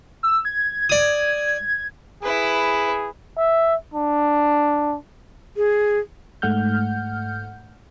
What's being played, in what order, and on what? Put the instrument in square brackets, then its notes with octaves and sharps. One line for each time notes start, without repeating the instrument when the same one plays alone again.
[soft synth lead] E6
G#6
[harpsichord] D5 D#6
[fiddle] E4 B4 [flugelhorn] G#4
[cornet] E5
D4
[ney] G#4
[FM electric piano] G#2 A3 F#5 F6 G6